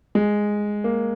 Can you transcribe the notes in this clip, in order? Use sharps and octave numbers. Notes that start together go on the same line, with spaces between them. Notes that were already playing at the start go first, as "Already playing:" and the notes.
G#3
A#3